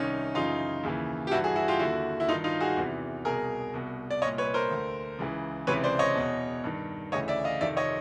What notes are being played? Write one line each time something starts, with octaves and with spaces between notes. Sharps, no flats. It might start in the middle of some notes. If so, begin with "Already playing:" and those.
Already playing: C2 C3 D#3 C#4 D#4
F#2 C#3 E3 D#4 F4
D#2 C#3 E3
G4
G2 E3 E4 F#4
F#4 G#4
E4 F#4
F4 G4
D#2 D3 E4 F#4
E4
G2 D#3 D#4 F4
D#4 F4
F#4 G#4
E2 C3 E3
C2 B2 G#4 A#4
C2 B2
D5
C2 A#2 C#5 D#5
B4 C#5
A#4 C5
D2 D3
C#2 C#3 E3
C#2 C3 E3 B4 C#5
C5 D5
C#5 D#5
E2 B2
G2 D#3
D2 C#3 E3 C#5 D#5
D5 E5
D#5 F5
F2 C3 D#3 D5 E5
C#5 D#5